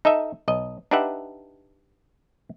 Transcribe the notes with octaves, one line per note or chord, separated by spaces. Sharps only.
D#4 A4 D#5 E5
B1 D#5
D4 D#4 G4 B4 E5 F#5